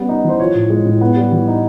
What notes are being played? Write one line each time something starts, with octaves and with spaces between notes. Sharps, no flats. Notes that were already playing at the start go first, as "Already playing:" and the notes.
Already playing: G3 B3 C#4
D#4
E3 C5
F3 C#5
A2
G#3
A2
B3
G3
E3
D#4